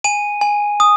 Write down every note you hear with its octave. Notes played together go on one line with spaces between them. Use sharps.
G#5 D#7
G#5
D#6